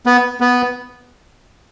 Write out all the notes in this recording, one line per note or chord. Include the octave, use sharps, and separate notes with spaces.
B3
B3